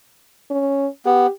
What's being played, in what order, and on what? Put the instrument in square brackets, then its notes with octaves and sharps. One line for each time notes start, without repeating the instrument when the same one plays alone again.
[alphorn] C#4
[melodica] B3 [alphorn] G4